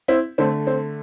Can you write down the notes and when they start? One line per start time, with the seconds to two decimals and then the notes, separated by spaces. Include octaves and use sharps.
0.08 C4 E4
0.38 D3 A3 C4
0.67 C4